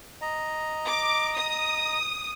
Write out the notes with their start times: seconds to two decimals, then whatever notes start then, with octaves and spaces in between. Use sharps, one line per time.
0.22 D#5 A#5
0.86 D6
1.36 D#6